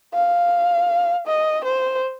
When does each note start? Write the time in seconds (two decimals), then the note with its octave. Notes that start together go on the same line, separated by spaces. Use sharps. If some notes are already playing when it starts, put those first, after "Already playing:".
0.14 F5
1.27 D#5
1.65 C5